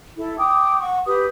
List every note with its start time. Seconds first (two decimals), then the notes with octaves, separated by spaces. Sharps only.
0.16 E4 A4
0.38 G5 D6 D#6
0.80 F#5 C#6
1.05 G4 B4 D#6